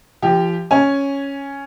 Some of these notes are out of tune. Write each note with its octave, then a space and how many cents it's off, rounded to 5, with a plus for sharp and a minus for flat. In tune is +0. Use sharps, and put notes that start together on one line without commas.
F3 -35 G4 +0
C#4 +0 G#5 +0